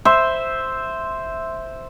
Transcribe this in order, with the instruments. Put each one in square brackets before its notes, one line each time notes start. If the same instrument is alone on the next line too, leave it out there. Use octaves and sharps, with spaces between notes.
[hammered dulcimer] C5 E5